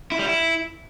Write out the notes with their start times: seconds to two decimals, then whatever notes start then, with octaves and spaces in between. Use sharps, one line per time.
0.12 E4
0.19 G3
0.26 E4